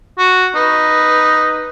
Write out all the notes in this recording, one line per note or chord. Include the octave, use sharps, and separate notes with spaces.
F#4
D#4 B4